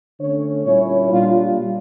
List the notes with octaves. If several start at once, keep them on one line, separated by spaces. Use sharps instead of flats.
D3 A3 C#4 C#5
A#2 G3 C#4 E4 C#5
A#2 G3 D4 F4